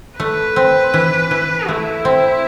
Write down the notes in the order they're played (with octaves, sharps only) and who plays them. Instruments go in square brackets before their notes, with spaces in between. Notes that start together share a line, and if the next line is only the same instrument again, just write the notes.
[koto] A3 [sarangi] B4
[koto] C4
E3
E3
[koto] A3 [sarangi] E4
[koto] C4